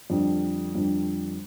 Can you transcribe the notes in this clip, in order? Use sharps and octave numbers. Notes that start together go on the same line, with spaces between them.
F2 D3 G3
F2 D3 G3